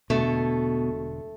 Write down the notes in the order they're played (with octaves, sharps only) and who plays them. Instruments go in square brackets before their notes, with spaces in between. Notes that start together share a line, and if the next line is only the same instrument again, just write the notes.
[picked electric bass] E1 D3 [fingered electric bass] B2 [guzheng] A3